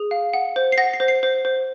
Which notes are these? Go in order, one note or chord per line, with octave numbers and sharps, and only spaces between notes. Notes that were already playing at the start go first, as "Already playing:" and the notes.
Already playing: G#4
F5
F#5
C5
C7
F#5 A#6
C7
C5
C7
C5
C5